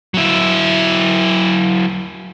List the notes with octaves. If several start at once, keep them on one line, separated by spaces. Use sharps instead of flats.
F#3 E4